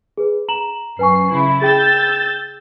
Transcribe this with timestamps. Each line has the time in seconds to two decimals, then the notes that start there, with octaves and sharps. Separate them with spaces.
0.17 G#4 B4
0.49 A#5 E7 F#7
0.99 F#2 B4 G#5 C#6 C7
1.31 C#3 E4
1.62 G#4 G5 E6 G6 A6